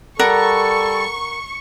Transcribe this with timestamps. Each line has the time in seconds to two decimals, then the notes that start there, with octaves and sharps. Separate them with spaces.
0.19 G3 A4 A#4 D5 F#5 A#5 C#6